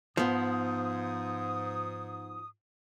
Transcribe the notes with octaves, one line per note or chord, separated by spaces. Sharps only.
G#2 F3 B3 D#6